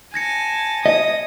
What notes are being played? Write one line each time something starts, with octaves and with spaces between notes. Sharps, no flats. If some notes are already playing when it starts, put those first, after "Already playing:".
G#5 A5 G#6 A#6 C#7
D#5 D#6